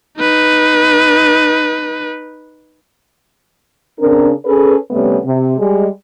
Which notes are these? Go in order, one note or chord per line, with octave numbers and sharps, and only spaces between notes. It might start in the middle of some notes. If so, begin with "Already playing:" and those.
D#4 B4
C#3 C4 D4 A#4
C#4 G#4 A4 B4
C3 G3 A3 B3 C#4
C3
G3 G#3